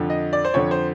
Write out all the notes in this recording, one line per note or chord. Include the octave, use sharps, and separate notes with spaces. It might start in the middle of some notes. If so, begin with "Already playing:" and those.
Already playing: F2 D3
D#5
D5
C5
F2 D3 C#5
C5